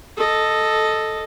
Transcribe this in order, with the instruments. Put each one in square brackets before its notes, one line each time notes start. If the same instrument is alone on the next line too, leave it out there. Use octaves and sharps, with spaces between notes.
[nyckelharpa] A4 D#5